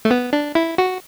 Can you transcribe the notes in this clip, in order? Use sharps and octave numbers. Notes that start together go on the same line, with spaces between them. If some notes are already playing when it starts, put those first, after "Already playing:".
A3
B3
D4
E4
F#4